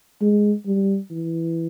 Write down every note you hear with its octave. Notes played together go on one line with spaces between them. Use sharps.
G#3
G3
E3